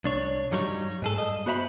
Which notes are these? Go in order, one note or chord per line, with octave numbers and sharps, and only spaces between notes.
C2 D4 C#5
G2 F#3 G3 D#4 B4 C#5
G#2 G#4 A4
G2 D#5
B3 F#4 C5 E5 A#5 B5